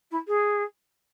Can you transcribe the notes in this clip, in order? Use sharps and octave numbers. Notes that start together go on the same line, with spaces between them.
E4
G#4